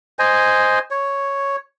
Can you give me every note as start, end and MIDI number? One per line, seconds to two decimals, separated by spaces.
0.19 0.79 72
0.19 0.79 75
0.19 0.79 80
0.91 1.56 73